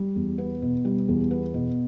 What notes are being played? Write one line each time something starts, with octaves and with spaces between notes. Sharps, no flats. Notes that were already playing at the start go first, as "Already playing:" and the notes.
Already playing: G3
E2
B3
B2
G3
E2
B3
B2